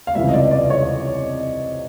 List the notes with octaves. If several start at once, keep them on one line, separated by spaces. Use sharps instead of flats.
F5
C#2 C3 E3 G3 E5
D#5
D5
D5
C#5